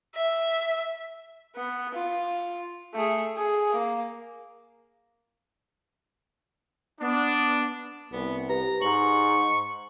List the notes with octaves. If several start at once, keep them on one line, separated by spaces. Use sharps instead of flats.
E5
B3
F4
A3 G#4
G#4
A#3
B3 D4
C2 B3
G4 B4 A#5
G#2 C#6 F#7